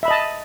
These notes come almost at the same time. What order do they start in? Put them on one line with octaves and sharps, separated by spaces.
E5 B5 D#5 A5